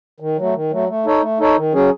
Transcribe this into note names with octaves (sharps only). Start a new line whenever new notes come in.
D#3
F#3 A3
D#3
F#3 A3
A3
D#4 A4 C#5
A3
D#4 A4 C#5
D#3
F#3 C#4 G#4